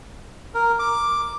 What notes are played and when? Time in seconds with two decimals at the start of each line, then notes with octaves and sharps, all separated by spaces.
0.54 A#4
0.79 D6